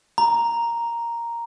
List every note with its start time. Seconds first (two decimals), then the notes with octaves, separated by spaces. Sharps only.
0.18 A#5